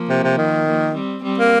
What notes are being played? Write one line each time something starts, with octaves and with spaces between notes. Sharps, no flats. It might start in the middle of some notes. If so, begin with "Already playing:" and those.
Already playing: F3 A#3
C3
C3
D#3
F3 A#3
G3 C4
G3 C4
A#3